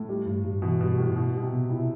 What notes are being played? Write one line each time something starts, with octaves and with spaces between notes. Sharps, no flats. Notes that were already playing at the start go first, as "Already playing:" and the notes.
Already playing: A2 A3
G3
G2
G2
B2 E3
G2 B2
A2 G3
B2 E4
B2 G3
C3
B2
C3 E4